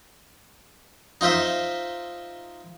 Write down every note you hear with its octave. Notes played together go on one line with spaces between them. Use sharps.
D#4 F4 C5 E5